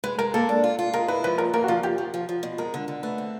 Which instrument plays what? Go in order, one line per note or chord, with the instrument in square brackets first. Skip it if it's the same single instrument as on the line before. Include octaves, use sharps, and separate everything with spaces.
[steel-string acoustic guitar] G#3 [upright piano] B4
[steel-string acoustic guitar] G#3 [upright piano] A#4
[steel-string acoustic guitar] A#3 [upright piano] A4
[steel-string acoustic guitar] D4
F4
F4
[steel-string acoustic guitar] G#3 [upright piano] A#4
[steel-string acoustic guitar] E4 [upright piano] B4
[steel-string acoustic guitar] F3 [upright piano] B4
[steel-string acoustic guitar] A#2 [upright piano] A#4
[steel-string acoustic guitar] A#3 [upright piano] A#4
[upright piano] F#4
[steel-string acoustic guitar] F3 [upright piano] F4
[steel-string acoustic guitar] F3 [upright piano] G4
[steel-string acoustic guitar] F3
F3
F3
B2
[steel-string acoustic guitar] G#3 [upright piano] A#4
[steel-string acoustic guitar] D3
D3
[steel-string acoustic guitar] A3 [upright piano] B4
[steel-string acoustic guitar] C4